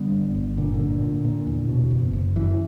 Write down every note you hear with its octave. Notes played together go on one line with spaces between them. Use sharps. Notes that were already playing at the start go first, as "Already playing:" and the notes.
Already playing: D3 G3 B3
G1
G1
A#2 D3
D3
A#2
A#2
A#2
E2
B2
F#1
F#1
F#2 E3